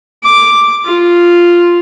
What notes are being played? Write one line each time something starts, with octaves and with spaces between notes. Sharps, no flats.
D6
F4